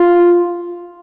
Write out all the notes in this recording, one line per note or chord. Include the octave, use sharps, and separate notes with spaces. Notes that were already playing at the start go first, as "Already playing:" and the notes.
Already playing: F4